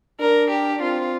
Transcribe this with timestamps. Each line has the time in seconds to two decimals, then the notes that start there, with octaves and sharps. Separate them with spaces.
0.20 D4 A#4
0.50 G4
0.81 C4 F4